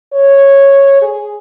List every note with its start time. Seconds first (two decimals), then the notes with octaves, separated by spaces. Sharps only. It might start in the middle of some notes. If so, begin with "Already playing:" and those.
0.13 C#5
1.02 G#4